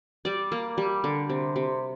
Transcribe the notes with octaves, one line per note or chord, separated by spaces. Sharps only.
G3 D5
A#3
G3
D3
C3
C3